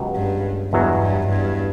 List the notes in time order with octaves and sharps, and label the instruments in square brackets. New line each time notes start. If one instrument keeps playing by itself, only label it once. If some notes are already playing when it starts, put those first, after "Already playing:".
Already playing: [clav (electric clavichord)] C#2 B2 F#3 G4
[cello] G2
[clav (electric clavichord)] E2 B2 F#3 [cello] G2
[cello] G2
G2